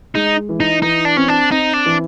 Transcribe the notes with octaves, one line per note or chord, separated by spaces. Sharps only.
G#3 D#4
E3
D#4
E3 D#4
D4
C4 C#4
D4
C4 D#4
D4
E3